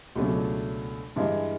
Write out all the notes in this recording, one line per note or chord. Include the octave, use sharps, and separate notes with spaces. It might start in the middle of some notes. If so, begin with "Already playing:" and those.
C#2 B2 F#3 A3 D4
G2 E3 G#3